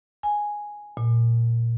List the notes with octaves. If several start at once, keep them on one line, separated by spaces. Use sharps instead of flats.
G#5
A#2